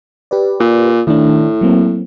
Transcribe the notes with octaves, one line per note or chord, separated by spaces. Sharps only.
G4 B4 D5
A#2
A2 D#3 A3 D4
F#3 A#3 C4